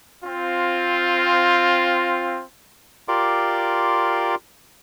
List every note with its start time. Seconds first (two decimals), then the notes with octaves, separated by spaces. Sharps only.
0.24 C4 F4
3.08 F4 G4 A#4 D5 C6 D6